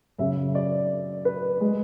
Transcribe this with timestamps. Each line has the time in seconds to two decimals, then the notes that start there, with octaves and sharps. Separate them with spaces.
0.18 F#2 C#3 F#3 E5
0.55 D5
1.25 B4
1.60 G#3